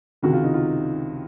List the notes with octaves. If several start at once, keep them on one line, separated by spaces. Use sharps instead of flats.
C#2 C3 D#3 F#4
F4
D#4
F4